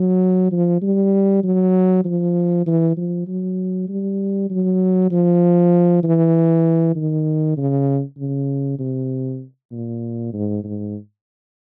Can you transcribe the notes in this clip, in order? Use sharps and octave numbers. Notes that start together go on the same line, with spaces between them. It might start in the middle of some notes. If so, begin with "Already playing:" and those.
Already playing: F#3
F3
G3
F#3
F3
E3
F3
F#3
G3
F#3
F3
E3
D#3
C#3
C#3
C3
A#2
G#2
G#2